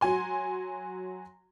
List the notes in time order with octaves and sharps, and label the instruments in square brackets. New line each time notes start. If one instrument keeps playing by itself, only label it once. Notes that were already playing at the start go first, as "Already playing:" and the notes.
[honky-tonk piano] F#3 F#4 G#5 C6